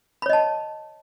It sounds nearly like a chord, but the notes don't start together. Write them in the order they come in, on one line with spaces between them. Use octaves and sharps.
B5 C#5 D#5 A5